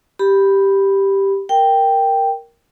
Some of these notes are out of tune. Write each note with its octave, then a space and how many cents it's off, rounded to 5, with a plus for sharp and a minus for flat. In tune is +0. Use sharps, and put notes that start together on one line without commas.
G4 +0 B5 +0
A#4 +0 G5 +0